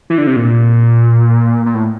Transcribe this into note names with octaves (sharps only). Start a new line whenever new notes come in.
E3
D3
C3
A#2
A#2
A2